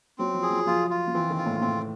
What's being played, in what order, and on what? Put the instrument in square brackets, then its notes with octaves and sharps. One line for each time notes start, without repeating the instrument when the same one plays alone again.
[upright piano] F#3 [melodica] C4
[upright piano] F3
[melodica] G#4
[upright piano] F3
[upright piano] F3 [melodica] F4
[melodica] F4
[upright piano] F3
[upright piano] E3 [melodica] C4
[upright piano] D#3
[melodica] F4
[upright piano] A2
[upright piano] A2 [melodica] C4